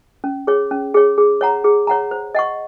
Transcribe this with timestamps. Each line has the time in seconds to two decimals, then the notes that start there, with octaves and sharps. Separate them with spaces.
0.24 C#4
0.47 G#4 C#5
0.71 C#4
0.94 G#4 C#5
1.18 G#4
1.41 C#5 F#5 A#5
1.64 G#4
1.87 C#5 F#5 A#5
2.11 C5
2.35 D#5 F#5 C#6